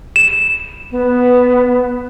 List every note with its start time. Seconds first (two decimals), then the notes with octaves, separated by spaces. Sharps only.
0.16 E7
0.92 B3